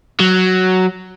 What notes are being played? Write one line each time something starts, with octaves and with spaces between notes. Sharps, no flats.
F#3